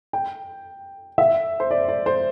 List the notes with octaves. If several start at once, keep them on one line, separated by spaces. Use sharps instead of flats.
G5
E5
C5
D5
D5
C5